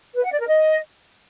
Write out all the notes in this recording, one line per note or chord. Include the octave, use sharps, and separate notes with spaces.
B4
F#5
D5
A#4
D#5